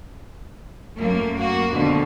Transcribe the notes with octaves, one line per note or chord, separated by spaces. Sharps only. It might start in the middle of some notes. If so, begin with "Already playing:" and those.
F#2 A3 A#3
A#3 F#4
F2 B2 D3 D#3